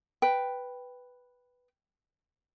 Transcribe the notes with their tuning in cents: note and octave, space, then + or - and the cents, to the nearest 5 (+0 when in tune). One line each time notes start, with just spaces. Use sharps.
B4 +0 G5 +0